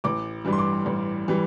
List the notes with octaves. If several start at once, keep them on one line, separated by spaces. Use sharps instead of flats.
A1 D6
G2 E3 G3
C6
D6
A1
E3 G3